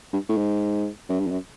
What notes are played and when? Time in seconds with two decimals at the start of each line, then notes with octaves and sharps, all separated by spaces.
0.13 G2
0.29 A2
0.37 G#2
1.09 F#2
1.20 G2
1.27 F2
1.30 F#2